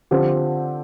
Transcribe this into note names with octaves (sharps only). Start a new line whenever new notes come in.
D3 F3 C4 G4